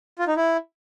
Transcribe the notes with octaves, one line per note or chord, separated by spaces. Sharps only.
F4
D#4
E4